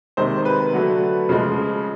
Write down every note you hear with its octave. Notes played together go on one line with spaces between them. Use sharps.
C3 D#3 G#3 C5
B4
D3 F#3 A3
C#3 F3 G#3